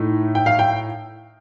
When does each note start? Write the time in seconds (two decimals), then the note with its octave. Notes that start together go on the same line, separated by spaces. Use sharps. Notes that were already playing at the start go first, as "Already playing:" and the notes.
Already playing: A2 A3 D#4
0.35 G5
0.46 F5
0.59 G5